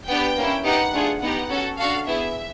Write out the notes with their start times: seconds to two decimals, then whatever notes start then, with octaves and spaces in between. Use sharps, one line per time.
0.08 B3 D4 G4 G5
0.37 A#3 C#4 E4
0.65 B3 D#4 G4 F#5
0.93 A3 D4 F4 G#4
1.22 B3 D#4 G4 F#5
1.50 C#4 F#4 A4
1.78 D4 F#4 A4 F5
2.07 B3 E4 G#4 E5